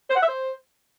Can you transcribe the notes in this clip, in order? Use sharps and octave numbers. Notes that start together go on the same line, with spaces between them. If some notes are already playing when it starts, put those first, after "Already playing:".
C5
F#5
E5
C5